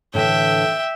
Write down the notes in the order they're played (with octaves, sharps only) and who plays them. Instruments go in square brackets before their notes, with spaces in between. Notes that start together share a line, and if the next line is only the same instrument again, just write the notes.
[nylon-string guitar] A2 D3 E3 [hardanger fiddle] E5 G5